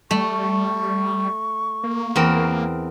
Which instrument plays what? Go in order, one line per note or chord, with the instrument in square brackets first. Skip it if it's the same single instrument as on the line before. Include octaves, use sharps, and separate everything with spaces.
[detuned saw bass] G3 [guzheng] A3 [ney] C#6
[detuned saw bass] A#3
[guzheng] E2 C4 A#4